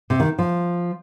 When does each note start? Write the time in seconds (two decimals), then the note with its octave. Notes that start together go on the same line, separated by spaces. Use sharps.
0.10 C3
0.20 D#3
0.39 F3